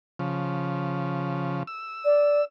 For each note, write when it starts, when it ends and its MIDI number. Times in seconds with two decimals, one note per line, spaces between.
0.19 1.63 49
0.19 1.63 53
1.67 2.45 88
2.05 2.42 74